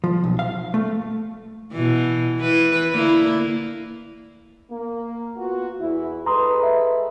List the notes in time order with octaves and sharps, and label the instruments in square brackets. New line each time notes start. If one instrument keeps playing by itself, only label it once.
[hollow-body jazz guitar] F3
B1
F5
A3
[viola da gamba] B2 E3
E3 B4
D3 A#3 E4
[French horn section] A#3
B3 F4 F#4
E2 E4
[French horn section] G#3 A4 B4 [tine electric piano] A#5 C6 D#6
[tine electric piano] E5